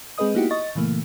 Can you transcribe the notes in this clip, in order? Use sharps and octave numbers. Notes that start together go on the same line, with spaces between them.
G#3 C4 G#4 B4 D#5 D#6
A#3 B3 D#4 E4 F#4 G4
D#5 C#6 A6
A#2 C#3 E3 A3 A#3